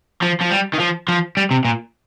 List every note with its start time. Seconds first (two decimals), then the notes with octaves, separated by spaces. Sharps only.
0.22 F3
0.41 F3
0.50 G3
0.73 D#3
0.80 F3
1.08 F3
1.37 G3
1.51 C3
1.65 A#2